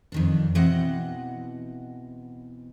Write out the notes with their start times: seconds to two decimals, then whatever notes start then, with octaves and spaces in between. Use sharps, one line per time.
0.12 F2 D#3 D4
0.55 B2 E3 C4 D#5 F#5